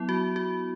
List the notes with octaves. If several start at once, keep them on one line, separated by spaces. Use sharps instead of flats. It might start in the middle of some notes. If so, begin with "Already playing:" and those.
Already playing: F#3 B3 E4
F#4
F#4